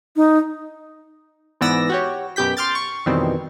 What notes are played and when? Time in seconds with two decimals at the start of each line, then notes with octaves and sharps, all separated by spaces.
0.16 D#4
1.61 G#2 E3 B3 D5 E6 A#6
1.90 F#4 G4 C#5
2.36 F#2 B2 G4 G6 B6
2.57 C6 D6 F6 G6 A6
2.75 C#6
3.06 F2 B2 D#3 E3 G3 C4